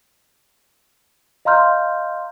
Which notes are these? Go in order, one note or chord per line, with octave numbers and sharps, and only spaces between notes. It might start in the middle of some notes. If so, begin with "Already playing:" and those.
D#5 F5 A#5 C6 F6 G6